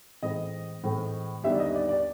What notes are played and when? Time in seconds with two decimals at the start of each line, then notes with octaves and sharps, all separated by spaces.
0.22 A2 E3 G#3 C4 D#5
0.84 A2 E3 G#3 C4
1.43 D#2 D3 G3 B3 D#4 E5
1.52 D5
1.59 D#5
1.74 D5
1.89 D5